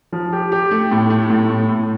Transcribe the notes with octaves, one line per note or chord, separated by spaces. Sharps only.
F3
G4
G4
A3
A2
A3
A2
A2
A2